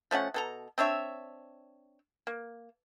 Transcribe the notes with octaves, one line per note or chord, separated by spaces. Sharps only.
F3 A3 C#4 F#5
B2 A4 A#5
C4 D4 C#5 E5
A#3